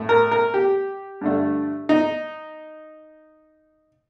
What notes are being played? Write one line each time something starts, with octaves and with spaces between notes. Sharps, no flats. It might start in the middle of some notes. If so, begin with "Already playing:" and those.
Already playing: A2 A3
A#4
A#4
G4
G2 D3 A3
D#4